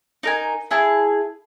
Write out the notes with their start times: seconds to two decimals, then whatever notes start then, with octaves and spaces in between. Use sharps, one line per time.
0.23 D#4 A#4 G#5
0.71 E4 G#4 A5